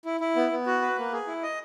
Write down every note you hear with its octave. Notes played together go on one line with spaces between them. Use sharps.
E4
E4
B3
B3
F#4
B4
A#3
G#4
E4
D#5